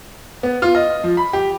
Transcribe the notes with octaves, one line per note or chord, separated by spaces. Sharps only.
B3
F4
D#5
F3
B5
G4